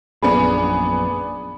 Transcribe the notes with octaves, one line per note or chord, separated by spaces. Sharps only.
A#1 F#2 A#2 B3 D4 G#4 B5